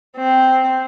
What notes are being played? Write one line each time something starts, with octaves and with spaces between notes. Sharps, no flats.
C4